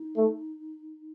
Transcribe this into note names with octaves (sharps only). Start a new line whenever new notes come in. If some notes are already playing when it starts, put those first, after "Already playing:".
Already playing: D#4
A3